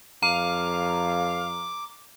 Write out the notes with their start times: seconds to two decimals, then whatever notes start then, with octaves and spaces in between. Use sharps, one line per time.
0.23 F2 F5 A#5 D6